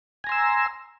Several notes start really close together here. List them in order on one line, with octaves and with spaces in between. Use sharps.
G#5 A#5 C6 E6